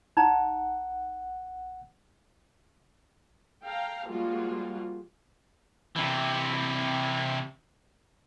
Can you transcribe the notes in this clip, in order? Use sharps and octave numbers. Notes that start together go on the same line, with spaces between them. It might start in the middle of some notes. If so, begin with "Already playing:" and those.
A#1 D#4 F#5 A#5
A4 F5 G5 A#5
F3 G3 G#3 A#3 F4 F#4
C3 E3